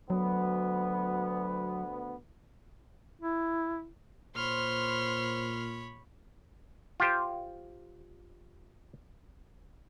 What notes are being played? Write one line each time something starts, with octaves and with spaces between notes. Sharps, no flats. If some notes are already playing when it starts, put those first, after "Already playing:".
D2 F#3 B3
E4
A#2 C5 C#5 B5 C6 F6
F4 G4 C5